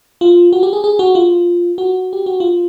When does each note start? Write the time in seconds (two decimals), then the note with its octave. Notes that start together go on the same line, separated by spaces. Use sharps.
0.21 F4
0.53 F#4
0.63 G4
0.73 G#4
0.84 G#4
0.99 F#4
1.15 F4
1.78 F#4
2.13 G4
2.26 F#4
2.40 F4